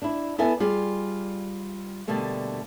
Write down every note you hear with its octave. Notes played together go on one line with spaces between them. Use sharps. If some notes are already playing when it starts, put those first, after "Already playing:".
D4 E4
B3 E4 A4 E5 G#5
G3 F4 G#4
B2 D3 G3 A3 A#3